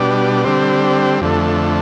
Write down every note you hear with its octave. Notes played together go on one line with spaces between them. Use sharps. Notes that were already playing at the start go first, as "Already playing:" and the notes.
Already playing: B2 G3 D4
D3 G3 C4
F2 D3 A3